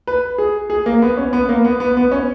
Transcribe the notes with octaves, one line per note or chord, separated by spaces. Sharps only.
B4
G#4
G#4
A#3
B3
C#4
B3
A#3
B3
B3
B3
C#4